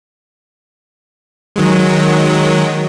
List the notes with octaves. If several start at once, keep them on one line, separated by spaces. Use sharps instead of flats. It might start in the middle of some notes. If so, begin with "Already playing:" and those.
D#3 F#3 G#3